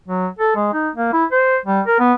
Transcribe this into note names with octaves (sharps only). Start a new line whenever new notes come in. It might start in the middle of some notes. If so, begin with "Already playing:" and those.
F#3
A4
G#3
D#4
A#3
E4
C5
G3
A#4
B3